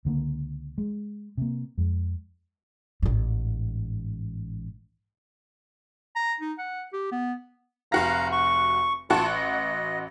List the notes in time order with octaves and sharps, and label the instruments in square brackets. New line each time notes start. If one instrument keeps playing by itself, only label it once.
[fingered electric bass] C#2 D3 A#3
G#3
C3 A#3
F2 G#3
[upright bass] A1 G#2
[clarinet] A#5
D#4
F#5
G4
B3
[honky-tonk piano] F1 F#4 A#6 [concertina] F5 A#5
[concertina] C#6
[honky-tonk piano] A1 F#4 C#6 [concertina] F4 A5
[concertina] D#5